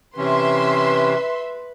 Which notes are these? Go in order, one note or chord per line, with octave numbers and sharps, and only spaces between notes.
C3 E3 C#4 B4 E5 C6